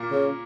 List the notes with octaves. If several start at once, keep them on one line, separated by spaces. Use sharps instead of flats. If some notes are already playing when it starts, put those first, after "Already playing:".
Already playing: A#2 A#3
C#3